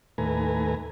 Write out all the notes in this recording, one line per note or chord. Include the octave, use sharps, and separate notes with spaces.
D#2 A2 A3 B4 G#5 A#5